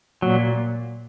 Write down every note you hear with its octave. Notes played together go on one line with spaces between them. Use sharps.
A#2 F#3